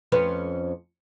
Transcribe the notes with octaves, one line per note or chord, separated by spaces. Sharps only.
F2 C#4 B4